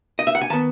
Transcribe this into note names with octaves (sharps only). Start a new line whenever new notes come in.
D#5
E5
F#5
G#5
D#3 B3 A5